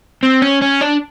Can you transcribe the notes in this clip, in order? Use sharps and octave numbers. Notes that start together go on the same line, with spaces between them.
C4
C#4
C#4
D4